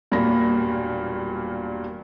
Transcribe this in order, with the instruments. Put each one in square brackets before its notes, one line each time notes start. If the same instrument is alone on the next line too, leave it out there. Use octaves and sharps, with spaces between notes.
[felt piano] E1 G2 A#2 A#3 B5 A#6